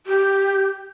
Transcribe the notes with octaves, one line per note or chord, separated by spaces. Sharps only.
G4